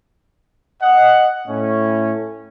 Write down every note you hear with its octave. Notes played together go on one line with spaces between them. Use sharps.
D#5 F#5
A2 C#4